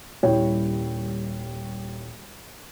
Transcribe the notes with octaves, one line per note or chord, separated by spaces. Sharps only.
D#1 G3 E4 C#5 G5